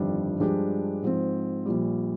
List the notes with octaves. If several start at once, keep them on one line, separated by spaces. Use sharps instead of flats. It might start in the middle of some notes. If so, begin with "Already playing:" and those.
Already playing: G1 F2 D#3 G3 D4
G2 F3 G#3 D4 G4
G#2 F3 C4
A#1 A#2 G3